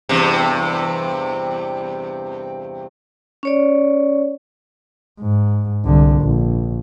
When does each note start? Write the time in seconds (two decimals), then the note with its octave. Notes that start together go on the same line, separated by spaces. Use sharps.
0.09 E2 G2 C3
3.43 C#4 C#5 D5
5.20 G#2
5.85 C2 D3
6.22 A#1